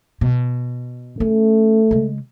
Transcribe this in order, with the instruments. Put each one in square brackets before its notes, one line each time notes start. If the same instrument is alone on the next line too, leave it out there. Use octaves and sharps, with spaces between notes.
[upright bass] B2
[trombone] A3 [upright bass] C#4
[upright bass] C#3 G#3